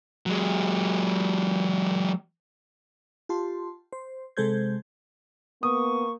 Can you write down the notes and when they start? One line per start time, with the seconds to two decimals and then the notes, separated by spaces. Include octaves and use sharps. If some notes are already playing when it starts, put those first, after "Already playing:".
0.26 F#3 G#3
3.29 F4 G4 A5 C6
3.93 C5
4.37 C3 G#3 A4 C5 G6 G#6
5.63 A#3 B3 C#6 D#6